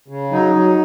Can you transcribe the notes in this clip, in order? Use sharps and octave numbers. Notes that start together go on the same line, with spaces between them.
C#3
F#3 D#4
F#3